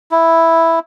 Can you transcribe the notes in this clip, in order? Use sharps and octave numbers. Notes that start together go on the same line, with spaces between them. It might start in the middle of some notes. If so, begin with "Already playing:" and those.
E4